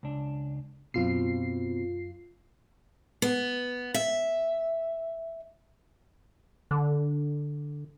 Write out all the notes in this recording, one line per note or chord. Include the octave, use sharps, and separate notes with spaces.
C#2 D4
F#2 B2 C4 F4 C7
B3
E5
D3